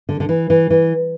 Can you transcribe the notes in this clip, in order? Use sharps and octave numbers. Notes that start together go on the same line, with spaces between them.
D3
D3
E3
E3
E3